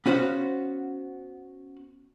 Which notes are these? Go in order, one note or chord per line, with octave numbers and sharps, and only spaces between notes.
B3 C#4 F#4 C5 F5